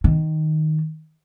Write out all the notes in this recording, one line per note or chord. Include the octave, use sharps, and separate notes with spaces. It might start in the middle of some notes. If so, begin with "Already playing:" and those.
D#3